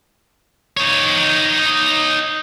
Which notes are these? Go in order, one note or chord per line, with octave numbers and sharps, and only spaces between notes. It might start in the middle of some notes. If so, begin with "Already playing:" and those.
D#4 C#5